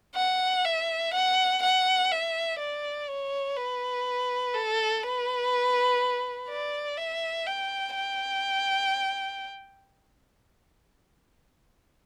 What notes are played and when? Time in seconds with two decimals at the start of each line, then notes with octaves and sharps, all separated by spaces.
0.15 F#5
0.65 E5
1.13 F#5
1.63 F#5
2.11 E5
2.59 D5
3.08 C#5
3.56 B4
4.54 A4
5.03 B4
6.49 D5
6.97 E5
7.47 G5
7.95 G5